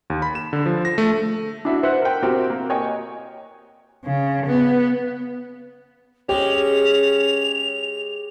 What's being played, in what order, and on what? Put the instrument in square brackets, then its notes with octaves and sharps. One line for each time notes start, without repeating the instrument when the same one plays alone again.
[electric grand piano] D#2
B5
E7
D3
F3
A#6
A3
[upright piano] D4 E4 F#4
C5 E5 F#5 F#6
A#4 G5
C4 F#4 G4 A#4 C5
A#3
C#5 D#5 G5 G#5
[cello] C#3
B3
[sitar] G#3 [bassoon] C#4 [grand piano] G4 [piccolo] F7